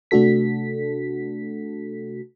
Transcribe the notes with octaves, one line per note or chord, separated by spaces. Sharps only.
C3 A3 D4 F#4 A4 B6